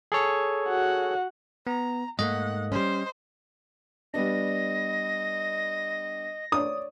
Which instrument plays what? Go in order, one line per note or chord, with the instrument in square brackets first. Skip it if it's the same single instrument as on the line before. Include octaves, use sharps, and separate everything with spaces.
[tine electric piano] G#4 A4 C#5
[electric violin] F#4 F#5
[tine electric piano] B3 [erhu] A#5
[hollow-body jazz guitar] G#2 A3 A#3 [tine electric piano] D#5 [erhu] F#5
[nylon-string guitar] G3 C#4 [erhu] C5
[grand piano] G3 B3 D4 [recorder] D#5 [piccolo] A#6
[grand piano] C#5 D5 [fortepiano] D#6